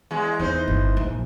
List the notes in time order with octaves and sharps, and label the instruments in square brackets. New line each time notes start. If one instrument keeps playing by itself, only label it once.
[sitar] E2 G#3
[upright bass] E2 [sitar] E3 D#4 C5
[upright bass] G1
A#1